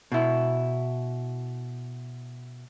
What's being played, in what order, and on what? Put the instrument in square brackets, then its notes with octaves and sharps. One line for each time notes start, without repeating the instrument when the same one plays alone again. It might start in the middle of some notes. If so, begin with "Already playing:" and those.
[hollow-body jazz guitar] B2 E4